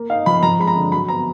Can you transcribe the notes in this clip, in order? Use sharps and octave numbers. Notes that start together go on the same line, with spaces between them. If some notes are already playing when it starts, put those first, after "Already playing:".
Already playing: A#3
D#4 F5
F3 B5
F3 A#5
G#3 B5
A#5
D3
F#3 B5
B3 A#5